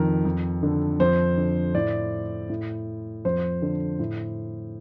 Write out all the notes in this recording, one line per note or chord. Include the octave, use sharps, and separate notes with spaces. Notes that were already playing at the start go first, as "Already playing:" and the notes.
Already playing: F2 D#3 A#4
F2
D3
F2 C5
D3
A2 D5
A2
F2 C5
D3
A2